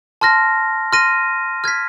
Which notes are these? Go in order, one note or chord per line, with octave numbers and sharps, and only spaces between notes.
A5 C6 F6 A#6
C6 F6 A#6 D#7
F6 G#6 B6